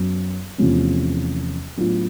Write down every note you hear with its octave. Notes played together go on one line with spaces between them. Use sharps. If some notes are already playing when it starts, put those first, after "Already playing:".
Already playing: F#2 F#3 B3
E2 C3 F3 A3 C#4
A2 F#3 B3 D4 F4